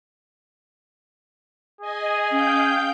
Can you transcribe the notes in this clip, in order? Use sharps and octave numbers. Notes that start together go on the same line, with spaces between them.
G#4 D#5 G#5
C#4 F5 G5 G6